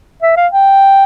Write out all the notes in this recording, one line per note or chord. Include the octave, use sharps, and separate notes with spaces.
E5
F5
G5